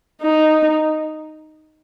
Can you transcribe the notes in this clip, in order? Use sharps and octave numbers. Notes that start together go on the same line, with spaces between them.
D#4